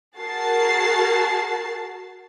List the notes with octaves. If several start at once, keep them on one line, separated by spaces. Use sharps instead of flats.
F#4 G#4 A#4 A5 A6 C7